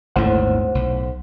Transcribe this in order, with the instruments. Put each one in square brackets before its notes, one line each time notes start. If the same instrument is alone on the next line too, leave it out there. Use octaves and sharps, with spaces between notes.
[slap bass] G#1 D#2 D3 [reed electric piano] A2 C5 F#5
[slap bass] B1